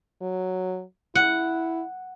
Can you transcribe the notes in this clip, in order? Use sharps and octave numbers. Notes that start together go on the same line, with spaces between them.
F#3
E4 F#5